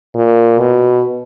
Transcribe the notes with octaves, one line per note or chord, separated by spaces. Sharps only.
A#2
B2